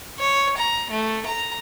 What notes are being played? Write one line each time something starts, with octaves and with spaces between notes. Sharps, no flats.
C#5
A#5
A3
A#5